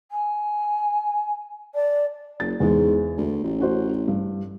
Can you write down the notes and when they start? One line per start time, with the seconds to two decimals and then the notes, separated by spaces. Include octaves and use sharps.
0.11 G#5
1.75 D5 A5
2.40 F#1 A6
2.60 E2 G#2 G#3
3.17 D2
3.44 A1
3.59 C#4 F#4 C5
4.08 G2